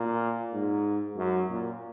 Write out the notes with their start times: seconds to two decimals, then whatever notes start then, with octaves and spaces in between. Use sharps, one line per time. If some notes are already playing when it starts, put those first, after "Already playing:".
Already playing: A#2
0.53 G#2
1.16 F#2
1.49 A#2